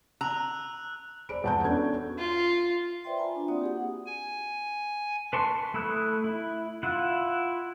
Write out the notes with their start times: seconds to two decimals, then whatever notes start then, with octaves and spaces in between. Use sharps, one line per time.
0.21 A#5 E6 F#6 F7
1.29 G#4 C5 D5 B5 D7
1.44 E2 F#5 A5 A#5 G6
1.65 B3 C#4 D4 F#4 A4 G#6
2.18 F4
3.04 B4 C5 D5 E5 G5 C6
3.18 F4 G#5 A#5 B5
3.35 D4 F4
3.48 A#3 C4 F#4 D5 F#5 D#6
3.61 G4 G#4 F#5
4.06 G#5
5.33 B4 A5 C6 C#6
5.74 A3 E4 B5 D#6 F#6
6.24 E4
6.83 E4 F4 F#5